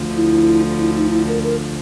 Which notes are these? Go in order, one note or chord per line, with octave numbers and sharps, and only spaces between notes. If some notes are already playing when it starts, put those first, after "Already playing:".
Already playing: D2 D3 F3
E4
E4
D#4
E4
A#4
A#4